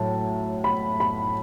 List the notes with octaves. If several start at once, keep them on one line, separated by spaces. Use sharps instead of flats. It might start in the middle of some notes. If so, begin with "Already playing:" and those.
Already playing: A2 F#3 A5
B5
B5